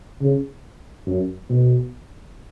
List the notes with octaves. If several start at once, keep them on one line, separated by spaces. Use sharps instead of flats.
C#3
F#2
B2